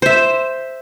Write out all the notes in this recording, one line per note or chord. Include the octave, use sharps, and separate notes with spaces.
C5 E5